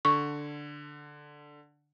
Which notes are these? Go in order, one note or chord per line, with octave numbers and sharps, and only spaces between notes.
D3 C#6